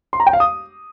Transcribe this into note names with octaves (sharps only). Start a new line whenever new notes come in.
C6
A#5
G5
F5
D#6